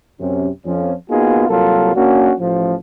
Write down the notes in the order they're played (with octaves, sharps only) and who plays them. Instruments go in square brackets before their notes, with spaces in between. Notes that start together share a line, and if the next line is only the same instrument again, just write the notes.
[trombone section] F#2 C3 C#4
F2 F3 C#4
A#3 B3 D#4 F4 F#4 G#4
C2 F#3 A#3 F4 A4 A#4
A#3 C#4 D4 F#4
A1 F3